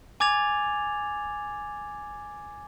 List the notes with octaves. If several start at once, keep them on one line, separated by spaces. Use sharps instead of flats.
G#5 D6 G#6 A6 F7